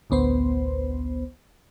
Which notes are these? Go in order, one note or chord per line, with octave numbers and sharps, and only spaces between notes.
A1 D2 B3 C5